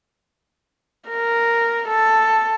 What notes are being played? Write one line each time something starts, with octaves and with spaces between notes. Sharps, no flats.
A#4
A4